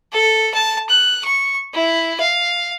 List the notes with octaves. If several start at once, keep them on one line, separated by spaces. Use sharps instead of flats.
A4
A5
F#6
C#6
E4
F5